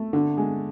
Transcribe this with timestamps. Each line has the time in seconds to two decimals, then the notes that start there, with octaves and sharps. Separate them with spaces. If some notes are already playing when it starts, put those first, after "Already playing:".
Already playing: A3
0.13 D3
0.37 G#3